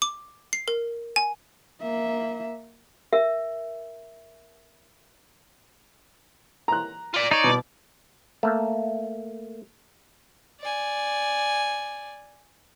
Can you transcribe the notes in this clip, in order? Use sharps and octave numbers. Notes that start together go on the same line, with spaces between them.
D6
C7
A#4
G#5
A#3 E5
A#4 E5
A#5 F#6
F4 D5
D#4 C#5 D5
B2
A3 A#3
D5 G#5